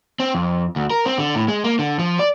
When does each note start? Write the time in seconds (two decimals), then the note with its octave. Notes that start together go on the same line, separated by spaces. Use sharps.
0.20 C4
0.35 F2
0.76 D2
0.90 A#4
1.06 C4
1.18 D3
1.35 A2
1.48 G#3
1.64 A#3
1.79 D3
1.99 F3
2.19 D5